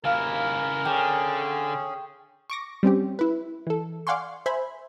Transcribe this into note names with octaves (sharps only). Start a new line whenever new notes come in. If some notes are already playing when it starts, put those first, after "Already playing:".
D#2 C#3 E4 A#4 F5
D3 C#4 G#4 G5
C#6 D6 A#6
G3 C4 C#4 G4
E4 B4
E3 A4
D5 F5 F#5 G#5 C6 C#6
C5 E5 G#5 B5